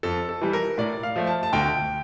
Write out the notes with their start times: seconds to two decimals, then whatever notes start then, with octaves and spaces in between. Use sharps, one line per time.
0.03 F2 A4
0.29 A4
0.41 E3 G3
0.53 A#4
0.78 A2 D5
1.03 F5
1.16 F3 A3
1.27 A5
1.43 A5
1.53 D2 G5